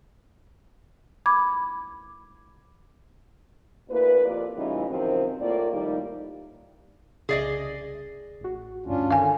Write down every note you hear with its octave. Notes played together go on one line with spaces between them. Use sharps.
B5 D6 G#6
D2 A#3 E4 B4
F2 A#3 F4 G4 D5
A2 C#3 E3 G3 D#4 F4
F#2 C3 D#3 F3 C4
A2 A#3 F4 D5
F2 A2 D#3 G3 A#3 D#4
C2 C#3 G#4 D5 D#5
A1 F#4
D2 G2 C#4 D4 F4
D3 D#3 F5 G#5